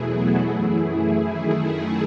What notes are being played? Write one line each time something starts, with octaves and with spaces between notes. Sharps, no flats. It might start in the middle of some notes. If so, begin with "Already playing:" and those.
Already playing: E2 B2 F#3 A3 E4 G#4
F#4 A4
F#2 E3 A3 E4 G#4
F#2 D#3 A3